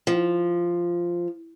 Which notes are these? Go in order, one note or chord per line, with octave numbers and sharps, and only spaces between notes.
F3